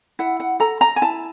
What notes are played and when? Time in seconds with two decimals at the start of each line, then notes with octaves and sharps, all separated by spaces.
0.19 E4 F#5
0.40 F#5
0.60 A4 A#5
0.81 A#5
0.96 G#5
1.02 E4 A5